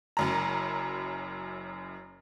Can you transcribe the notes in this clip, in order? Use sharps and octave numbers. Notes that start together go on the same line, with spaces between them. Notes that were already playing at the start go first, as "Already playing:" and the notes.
F#1 F#2 A#5